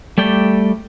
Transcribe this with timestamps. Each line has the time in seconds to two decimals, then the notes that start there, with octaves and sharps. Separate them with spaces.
0.18 G3 A3 D5 G5